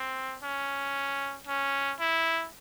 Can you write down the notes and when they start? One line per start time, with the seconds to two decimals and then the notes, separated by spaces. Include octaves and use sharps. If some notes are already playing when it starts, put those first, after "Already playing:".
Already playing: C4
0.43 C#4
1.47 C#4
2.00 E4